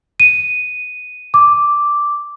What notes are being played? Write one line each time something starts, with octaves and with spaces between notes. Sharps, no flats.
D#7
D6